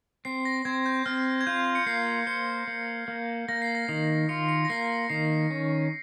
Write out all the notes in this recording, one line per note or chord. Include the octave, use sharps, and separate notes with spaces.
C4 C7
A#6
C4 G#6
G6
C4 F6
G#6
F4 G6
C#7
A#3 C7
C5 C#7
A#3
A#3
A#3 A#6
C7
A#6
D#3 C7
F4 C#7
C#7
A#6
A#3 C7
D#3 C7
C#4